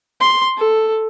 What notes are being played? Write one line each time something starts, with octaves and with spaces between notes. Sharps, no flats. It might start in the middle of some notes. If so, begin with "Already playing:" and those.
C6
A4